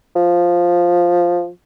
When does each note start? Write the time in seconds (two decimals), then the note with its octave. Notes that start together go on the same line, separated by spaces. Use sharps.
0.16 F3